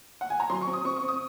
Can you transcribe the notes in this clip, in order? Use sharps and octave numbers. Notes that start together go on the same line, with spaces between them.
F#5
G#5
A#5
F#3 C6
C#6
C4
D#6
C4 C#6
C#6
C4
D#6